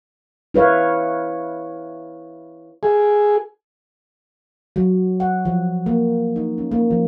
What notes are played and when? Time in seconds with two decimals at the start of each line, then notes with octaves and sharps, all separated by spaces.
0.54 E4 B4 C#5 F5
2.83 G#4
4.76 F#3
5.20 F#5
5.45 F3
5.86 A#3
6.36 D#4
6.58 C#4
6.72 A#3
6.91 F3